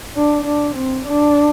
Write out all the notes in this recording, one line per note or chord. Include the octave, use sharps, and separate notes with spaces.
D4
D4
C4
D4